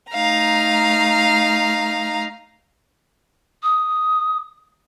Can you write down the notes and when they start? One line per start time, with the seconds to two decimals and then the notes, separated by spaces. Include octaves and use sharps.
0.13 A3 D#4 F5 A#5
3.63 D#6